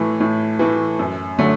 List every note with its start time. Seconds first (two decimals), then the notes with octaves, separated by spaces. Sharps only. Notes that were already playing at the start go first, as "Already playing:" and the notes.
Already playing: A2 E3 A3
0.20 A2
0.59 E3 A3
0.99 F#2
1.39 D3 F#3 A3